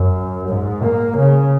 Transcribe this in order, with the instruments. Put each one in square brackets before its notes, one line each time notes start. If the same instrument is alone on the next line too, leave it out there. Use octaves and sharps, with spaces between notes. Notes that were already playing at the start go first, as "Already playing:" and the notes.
Already playing: [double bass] F#2
G#2
A#3
C#3